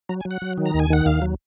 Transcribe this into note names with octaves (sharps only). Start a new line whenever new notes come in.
F#3 A#5
G#5
F#3
F#5
F#3
D#3
A#5
D#2
G#5
D#3 F#5
D#2 F5
F#3